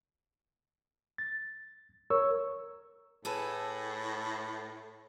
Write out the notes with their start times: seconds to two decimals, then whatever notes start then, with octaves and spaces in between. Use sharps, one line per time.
1.18 A6
2.10 A#4 C#5 C#6 E6
3.25 A2 G#4 A4 B4